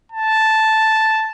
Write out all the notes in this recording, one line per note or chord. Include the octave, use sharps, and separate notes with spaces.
A5